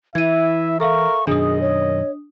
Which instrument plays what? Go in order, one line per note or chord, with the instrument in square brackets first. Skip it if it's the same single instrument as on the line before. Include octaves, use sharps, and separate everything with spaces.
[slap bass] E3 [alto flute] E4 [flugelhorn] E5 [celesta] G#6 D#7
[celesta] A4 E5 F5 [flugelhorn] A#4 [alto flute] C#6
[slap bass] F#2 B2 D#3 [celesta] D4 D#6 [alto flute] G#4 [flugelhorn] D#5
[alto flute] C#5